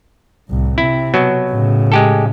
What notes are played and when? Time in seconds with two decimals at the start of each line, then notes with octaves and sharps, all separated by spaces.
0.48 C2 A2
0.78 C3 C4 E4
1.14 B2 F#3
1.51 A2 C#3
1.92 G#3 G4 A4